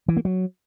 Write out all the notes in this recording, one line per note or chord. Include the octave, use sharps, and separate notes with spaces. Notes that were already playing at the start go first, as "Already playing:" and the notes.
E3
A#3
F#3